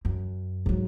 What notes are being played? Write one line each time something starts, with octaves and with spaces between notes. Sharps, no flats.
F#2
G#2 F#3